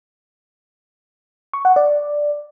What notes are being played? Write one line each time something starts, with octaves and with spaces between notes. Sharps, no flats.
C#6
F#5
D5